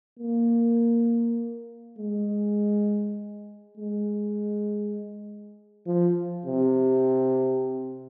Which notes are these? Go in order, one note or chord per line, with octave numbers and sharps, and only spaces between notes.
A#3
G#3
G#3
F3
C3